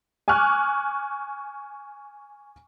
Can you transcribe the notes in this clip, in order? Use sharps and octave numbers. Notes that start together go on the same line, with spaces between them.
G#5 C#6 D6 F6 F#6